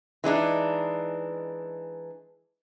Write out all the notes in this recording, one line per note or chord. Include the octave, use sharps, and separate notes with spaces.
E3 G#3 D4 D#4